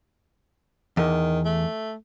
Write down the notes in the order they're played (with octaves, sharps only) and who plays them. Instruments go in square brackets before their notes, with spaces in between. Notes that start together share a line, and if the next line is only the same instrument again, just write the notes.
[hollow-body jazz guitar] E2 [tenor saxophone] D#3
[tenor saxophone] A3